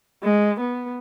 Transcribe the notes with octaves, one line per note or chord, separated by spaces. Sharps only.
G#3
B3